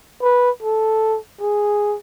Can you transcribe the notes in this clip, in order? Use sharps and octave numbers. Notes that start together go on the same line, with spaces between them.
B4
A4
G#4